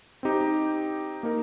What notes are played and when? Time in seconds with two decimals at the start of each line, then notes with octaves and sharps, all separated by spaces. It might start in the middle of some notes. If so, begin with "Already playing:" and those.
0.23 C4 D#4 G4
1.23 A#3 D#4 A#4